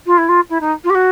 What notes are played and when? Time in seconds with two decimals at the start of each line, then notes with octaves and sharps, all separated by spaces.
0.06 F4
0.17 E4
0.28 F4
0.49 E4
0.60 D#4
0.84 F4
0.89 G4
0.94 F#4